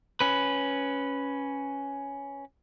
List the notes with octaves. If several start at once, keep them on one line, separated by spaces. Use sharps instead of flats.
C#4 B4